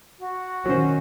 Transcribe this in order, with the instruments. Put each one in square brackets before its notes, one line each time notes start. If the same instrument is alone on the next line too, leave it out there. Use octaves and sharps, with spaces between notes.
[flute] F#4
[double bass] D#3 C#4 [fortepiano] F#3 C5